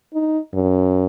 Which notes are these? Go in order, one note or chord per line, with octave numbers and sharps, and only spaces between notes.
D#4
F#2